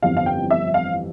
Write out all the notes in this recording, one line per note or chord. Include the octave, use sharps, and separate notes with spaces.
G1 F2 E3 G3 F5
F5
G5
E5
F5